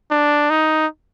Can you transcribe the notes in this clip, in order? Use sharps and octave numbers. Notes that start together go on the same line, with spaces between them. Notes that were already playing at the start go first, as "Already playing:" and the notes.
D4
D#4